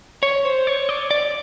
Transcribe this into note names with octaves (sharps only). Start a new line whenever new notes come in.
C#5
C5
C#5
D5
D5